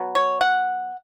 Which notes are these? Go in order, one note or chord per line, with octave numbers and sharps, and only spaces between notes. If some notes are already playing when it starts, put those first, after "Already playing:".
Already playing: B2 F#3 B3
C#5
F#5